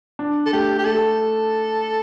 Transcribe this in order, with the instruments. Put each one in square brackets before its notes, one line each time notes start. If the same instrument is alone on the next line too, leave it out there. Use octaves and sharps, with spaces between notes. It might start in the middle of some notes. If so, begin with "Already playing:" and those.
[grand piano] D4
[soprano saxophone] A4
[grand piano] A3 [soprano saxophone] G4
[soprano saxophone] G4
[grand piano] A3 [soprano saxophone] A4